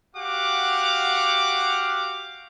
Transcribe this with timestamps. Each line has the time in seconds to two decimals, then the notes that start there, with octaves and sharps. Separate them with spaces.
0.16 F#4 G4 F5 F#5 D6